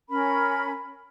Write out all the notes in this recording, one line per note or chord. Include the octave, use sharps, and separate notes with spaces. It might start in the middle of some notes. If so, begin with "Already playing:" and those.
C#4 A#4 B5